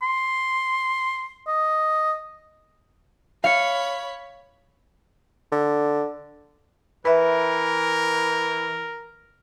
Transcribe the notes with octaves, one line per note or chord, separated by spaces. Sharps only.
C6
D#5
C#5 F5 B5 C#7
D3
E3 A#4 B4 E5